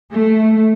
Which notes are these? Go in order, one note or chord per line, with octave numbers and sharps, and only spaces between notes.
A3